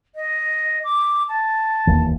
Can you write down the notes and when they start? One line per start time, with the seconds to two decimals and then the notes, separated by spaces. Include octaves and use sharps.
0.15 D#5
0.83 D6
1.28 A5
1.87 E1 D#2 E3